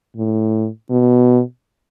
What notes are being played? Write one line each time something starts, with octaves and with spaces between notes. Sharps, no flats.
A2
B2